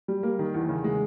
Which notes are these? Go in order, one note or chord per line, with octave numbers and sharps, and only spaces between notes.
G3
A#3
D#3
E2
C#3
G#3